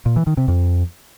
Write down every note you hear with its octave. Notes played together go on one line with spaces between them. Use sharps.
A#2
E3
D#3
C3
F2